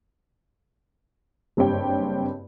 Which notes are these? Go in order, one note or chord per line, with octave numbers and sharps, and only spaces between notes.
F#1 G2 C4 G4 C#5 G5